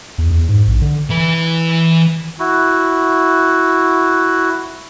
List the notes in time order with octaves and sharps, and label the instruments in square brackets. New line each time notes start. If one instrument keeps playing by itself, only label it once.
[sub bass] E2
E2
G#2
A#1
D3
[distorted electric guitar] E3 B4
[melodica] E4 F#4